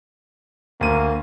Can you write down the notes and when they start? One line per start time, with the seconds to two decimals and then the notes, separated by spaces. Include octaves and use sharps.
0.81 D2 A#3 D#7